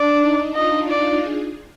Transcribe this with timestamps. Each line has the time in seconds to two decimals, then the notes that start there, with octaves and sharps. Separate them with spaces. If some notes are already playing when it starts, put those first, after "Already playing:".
Already playing: D4 D5
0.21 D#4
0.55 F4 D#5
0.89 D5
1.23 G#4